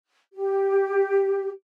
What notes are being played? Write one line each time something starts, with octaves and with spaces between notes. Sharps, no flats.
G4